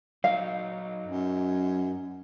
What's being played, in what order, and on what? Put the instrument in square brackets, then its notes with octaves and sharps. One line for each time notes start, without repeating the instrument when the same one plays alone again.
[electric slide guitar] F#3 D#4 [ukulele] F5
[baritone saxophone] F#2